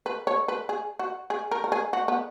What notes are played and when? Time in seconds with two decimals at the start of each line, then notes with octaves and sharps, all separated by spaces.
0.06 B4
0.27 C#5
0.48 B4
0.69 G#4
0.99 F#4
1.30 G#4
1.51 A#4
1.64 A#4
1.72 G#4
1.93 F#4
2.08 B3